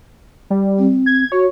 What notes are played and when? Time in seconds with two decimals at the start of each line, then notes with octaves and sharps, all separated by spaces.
0.50 G3
0.79 C4
1.06 G#6
1.32 F#4 C#5